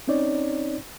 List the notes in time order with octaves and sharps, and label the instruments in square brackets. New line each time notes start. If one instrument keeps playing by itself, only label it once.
[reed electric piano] C4 C#4 D#4 C#5 D5